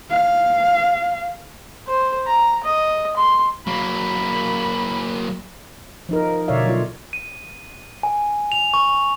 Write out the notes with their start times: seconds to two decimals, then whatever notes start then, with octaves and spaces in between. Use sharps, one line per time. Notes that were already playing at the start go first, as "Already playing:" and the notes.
0.10 F5
1.88 C5
2.27 A#5
2.64 D#5
3.17 C6
3.67 F#3 A#3 B5
6.09 F3 D#4 A#4
6.48 B2 D3 C#5 D5 E5 F5
6.66 F#3 F4
7.13 D#7
8.03 G#5
8.52 F7
8.74 C#6